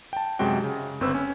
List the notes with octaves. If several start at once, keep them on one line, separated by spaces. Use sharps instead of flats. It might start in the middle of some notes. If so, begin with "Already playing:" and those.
G5 A5
F#2 C3 G#3 F#4 G5
C#3
G1 C4 B4 E6
C#4